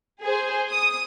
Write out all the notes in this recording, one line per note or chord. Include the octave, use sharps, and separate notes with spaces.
G#4 C5
D#6